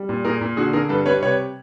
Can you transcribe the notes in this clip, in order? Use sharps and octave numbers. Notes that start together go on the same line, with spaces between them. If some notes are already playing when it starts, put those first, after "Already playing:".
Already playing: G3
A#2
A#2 G#4 A#4
A#2
D3 F#4 G#4
D3 G#4 A#4
G2 A4 B4
G3 B4 C#5
C3 B4 C#5